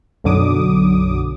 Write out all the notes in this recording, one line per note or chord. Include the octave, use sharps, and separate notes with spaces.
B1 F#2 D3 F#3 D6 D#6